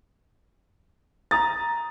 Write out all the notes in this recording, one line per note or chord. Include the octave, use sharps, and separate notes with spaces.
A#5 D#6 A6